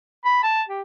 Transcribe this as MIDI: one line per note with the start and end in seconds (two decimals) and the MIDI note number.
0.25 0.40 83
0.44 0.62 81
0.69 0.82 67